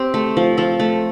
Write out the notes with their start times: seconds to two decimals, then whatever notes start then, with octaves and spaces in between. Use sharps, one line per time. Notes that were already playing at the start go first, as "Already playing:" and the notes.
Already playing: C4 G4
0.14 A3
0.37 F3
0.57 F3 A4
0.80 A3